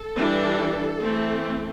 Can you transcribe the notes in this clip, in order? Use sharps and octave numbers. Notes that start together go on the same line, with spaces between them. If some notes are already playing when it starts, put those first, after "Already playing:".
Already playing: A4
E3 G3 D4
E3 A3 C4